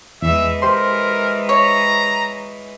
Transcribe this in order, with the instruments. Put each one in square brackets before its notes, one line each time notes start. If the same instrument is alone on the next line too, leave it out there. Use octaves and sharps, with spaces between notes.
[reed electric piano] E2 [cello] E3 G#3 [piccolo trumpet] E5
[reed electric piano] G4 C5 C6 [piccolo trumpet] A#4
[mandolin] C#5 [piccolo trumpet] A#5